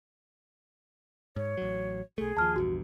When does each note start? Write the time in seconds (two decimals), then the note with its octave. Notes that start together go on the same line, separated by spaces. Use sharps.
1.36 G#2 C#5
1.57 A1 F#3
2.18 B1 A3 G#4
2.37 D#2 F3 A5 F6
2.56 A#1 E2 G2 F#4